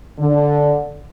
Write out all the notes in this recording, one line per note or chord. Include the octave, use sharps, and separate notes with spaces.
D3